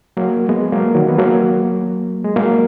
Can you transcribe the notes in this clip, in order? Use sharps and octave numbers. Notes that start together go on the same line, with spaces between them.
F#3 A#3
G#3 B3
F#3 A#3
D#3 F#3
B3
F#3 A#3
G#3
F#3 A#3